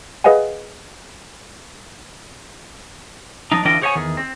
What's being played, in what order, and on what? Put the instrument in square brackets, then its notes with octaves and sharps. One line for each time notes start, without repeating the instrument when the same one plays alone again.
[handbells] G#4 B4 D#5 F5 F#5 G#5
[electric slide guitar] F3 D4 D#4
D3 E3 D4 F4 D#5 G5
G#4 C5 C#5 D#5 F#5 G#5
E2 D#3 G#4
C4